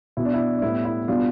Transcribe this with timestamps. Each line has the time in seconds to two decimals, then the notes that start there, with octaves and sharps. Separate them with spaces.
0.17 B2 B3 E4
0.25 D4
0.34 E4
0.57 D4
0.62 A2 G3 B3 E4
0.85 E4
1.08 B2 G3 B3 D4 F4